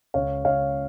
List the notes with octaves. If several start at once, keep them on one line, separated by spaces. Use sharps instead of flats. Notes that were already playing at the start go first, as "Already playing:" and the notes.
C#2 C#3 C#5 F5
C#2 C#3 C#5 F5